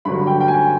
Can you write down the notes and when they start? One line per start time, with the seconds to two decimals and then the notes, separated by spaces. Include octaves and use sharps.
0.05 G2 D3 F#3 B5
0.27 G5
0.40 G5
0.48 G#5